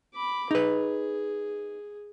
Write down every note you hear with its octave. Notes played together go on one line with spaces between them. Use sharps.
B5 D6
D#4 G#4 B4